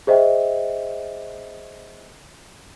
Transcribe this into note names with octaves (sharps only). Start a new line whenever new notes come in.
G#4 C5 D#5 E5 G5